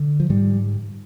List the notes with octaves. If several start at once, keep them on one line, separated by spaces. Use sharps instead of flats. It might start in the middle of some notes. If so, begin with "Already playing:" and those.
Already playing: D3
F3
G#2 G3